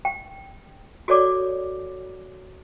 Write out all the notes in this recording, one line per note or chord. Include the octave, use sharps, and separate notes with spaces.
G5
F#4 A4 C#5 D5 D6